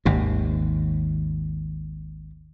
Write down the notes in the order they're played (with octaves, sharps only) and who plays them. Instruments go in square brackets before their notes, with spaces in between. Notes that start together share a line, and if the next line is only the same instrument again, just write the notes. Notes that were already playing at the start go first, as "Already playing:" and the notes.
[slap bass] G#1 D#2 C3